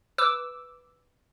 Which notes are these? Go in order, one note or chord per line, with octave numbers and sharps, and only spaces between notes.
B4 D6 E6